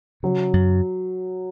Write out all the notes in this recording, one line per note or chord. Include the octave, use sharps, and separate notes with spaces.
C#3 F#3
F#2